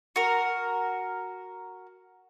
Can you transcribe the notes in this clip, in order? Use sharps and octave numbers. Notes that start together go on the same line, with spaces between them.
F#4 A#4